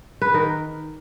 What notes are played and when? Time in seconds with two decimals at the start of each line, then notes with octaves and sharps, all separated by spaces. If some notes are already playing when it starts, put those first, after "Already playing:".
0.22 B4
0.34 D#3 A#4